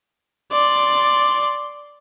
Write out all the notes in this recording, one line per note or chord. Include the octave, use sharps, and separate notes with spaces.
D5 C6